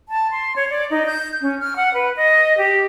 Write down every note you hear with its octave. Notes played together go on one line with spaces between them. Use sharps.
A5
C6
C#5
D5
D#4
G6
C#4
F6
F#5
B4
D#5
G4